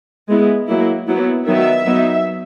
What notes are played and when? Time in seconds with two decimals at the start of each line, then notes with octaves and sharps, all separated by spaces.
0.29 G#3 B3 E4
0.68 F#3 A#3 E4
1.07 F#3 B3 E4
1.47 D#3 F#3 B3 E5
1.86 F#3 B3 D#4